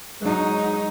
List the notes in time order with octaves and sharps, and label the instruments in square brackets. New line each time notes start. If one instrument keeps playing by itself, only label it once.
[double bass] F#3 D#4 [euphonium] G#3